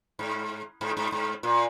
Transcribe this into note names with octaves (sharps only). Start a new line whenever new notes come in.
G#2
G#2
G#2
G#2
A#2